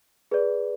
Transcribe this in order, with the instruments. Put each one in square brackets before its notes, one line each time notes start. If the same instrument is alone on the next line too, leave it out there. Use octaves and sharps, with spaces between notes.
[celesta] G#4 B4 D5